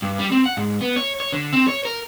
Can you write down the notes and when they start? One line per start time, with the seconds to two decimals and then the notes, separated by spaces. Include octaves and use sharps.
0.02 G2
0.19 G3
0.32 C4
0.46 F#5
0.57 G#2
0.81 B3
0.96 C#5
1.20 C#5
1.32 D3
1.53 C4
1.68 C#5
1.85 A#4